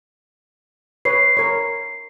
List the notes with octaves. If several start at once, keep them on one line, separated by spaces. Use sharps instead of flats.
B4 C#5 C7
A#4 C#5